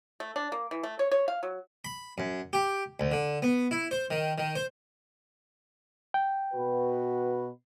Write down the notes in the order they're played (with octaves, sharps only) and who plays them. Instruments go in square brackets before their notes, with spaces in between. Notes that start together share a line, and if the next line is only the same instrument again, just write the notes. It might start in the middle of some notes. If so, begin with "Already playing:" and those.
[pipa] A3
D4
A#3
E3
A3
C#5
C#5
F5
F#3
[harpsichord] B5
F#2
G4
D2
D3
B3
E4
C5
D#3
D#3
C5
[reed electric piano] G5
[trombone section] B2 F#4 B4